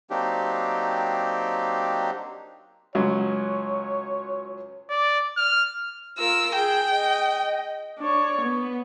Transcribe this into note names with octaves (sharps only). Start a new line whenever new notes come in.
F#3 A#3 C4 D4 D#4 G4
C#2 F#3 C#5
D5
F6
F4 A#4 E6
G#4 G5
D#5
D4 C#5
B3